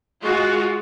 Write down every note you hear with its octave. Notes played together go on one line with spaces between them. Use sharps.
G#3 F4 F#4